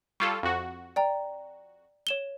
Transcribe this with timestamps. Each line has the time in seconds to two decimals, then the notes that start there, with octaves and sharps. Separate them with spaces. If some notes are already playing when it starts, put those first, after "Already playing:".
0.20 G3 F4 A4 C#6 G#6 C7
0.43 F2 F#4
0.96 D5 G5 A#5
2.07 C#5 E7 G7